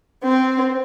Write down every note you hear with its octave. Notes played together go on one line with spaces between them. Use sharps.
C4